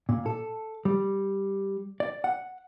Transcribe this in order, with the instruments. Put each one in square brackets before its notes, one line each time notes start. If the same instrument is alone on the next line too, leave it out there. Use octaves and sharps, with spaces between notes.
[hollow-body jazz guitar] A#2
A4
G3
D5
F#5